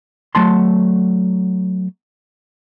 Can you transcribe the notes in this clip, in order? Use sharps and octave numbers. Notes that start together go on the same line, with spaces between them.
F#3 A3 A5 C6